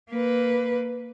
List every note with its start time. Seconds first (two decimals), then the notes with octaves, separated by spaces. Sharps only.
0.10 A#3 B4